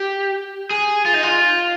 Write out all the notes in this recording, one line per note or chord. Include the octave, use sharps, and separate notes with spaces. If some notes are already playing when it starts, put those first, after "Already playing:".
Already playing: G4
G#4
F4
D#4
F4